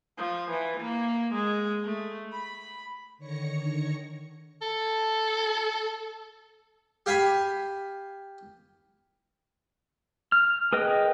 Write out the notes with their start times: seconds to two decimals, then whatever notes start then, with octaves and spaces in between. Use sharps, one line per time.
0.18 F3
0.51 E3
0.80 A#3
1.34 G#3
1.85 A3
2.33 B5
3.18 D3 D#3 C#5 A#6 C#7
4.62 A4
7.06 G4 F5 G#5 B5
10.32 F6
10.73 G#4 A#4 B4 D#5 G5